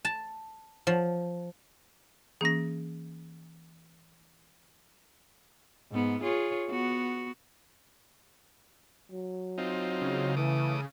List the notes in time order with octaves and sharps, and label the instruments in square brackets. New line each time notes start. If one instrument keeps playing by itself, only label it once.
[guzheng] A5
F3
[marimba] E3 A#3 C#4 [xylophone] G#4 A#6
[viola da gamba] G#2 B3
F4 G#4 C#5
B3 F#4
[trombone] F#3
[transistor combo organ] C4 D#4 F4
[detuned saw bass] C#3
[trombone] E3 [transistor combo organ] A3 D6 D#6